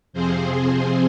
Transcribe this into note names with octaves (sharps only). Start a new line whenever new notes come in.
F2 C3 F3 C4 G#4 C5
G#4 C5